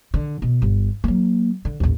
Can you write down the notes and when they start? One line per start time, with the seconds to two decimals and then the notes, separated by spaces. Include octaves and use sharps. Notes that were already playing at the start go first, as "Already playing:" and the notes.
0.14 D3
0.42 B2
0.62 G1
1.04 F#3 A#3
1.65 D3
1.80 A1 D#2